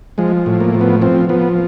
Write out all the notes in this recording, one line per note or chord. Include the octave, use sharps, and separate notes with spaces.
F3 G#3
A2
A#3
F3
B3
F3 C4
F3 B3